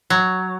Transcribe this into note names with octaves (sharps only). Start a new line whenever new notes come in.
F#3